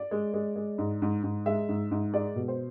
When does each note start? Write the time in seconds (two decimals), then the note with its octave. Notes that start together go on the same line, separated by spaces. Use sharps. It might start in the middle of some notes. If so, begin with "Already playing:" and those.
Already playing: D5
0.11 G#3
0.34 G#3
0.56 G#3
0.78 G#2
1.02 G#2
1.23 G#2
1.46 G#3 E5
1.69 G#2
1.91 G#2
2.14 G#3 D5
2.36 B2
2.48 C5